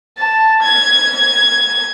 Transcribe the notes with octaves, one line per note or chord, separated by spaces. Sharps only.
A5
G#6